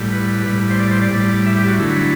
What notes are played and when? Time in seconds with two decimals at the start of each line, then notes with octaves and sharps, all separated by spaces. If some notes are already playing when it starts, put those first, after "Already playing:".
Already playing: A2 G3
0.12 B4
0.46 A2 G3
0.70 C5
0.79 D5
0.91 C5
1.02 D5
1.13 A2 G3
1.46 E5
1.57 G4
1.68 F#4
1.79 D3 F#3 A3 E4